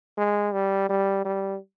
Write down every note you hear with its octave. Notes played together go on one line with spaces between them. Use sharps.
G#3
G3
G3
G3